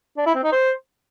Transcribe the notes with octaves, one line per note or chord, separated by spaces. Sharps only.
D4
E4
C4
D#4
C5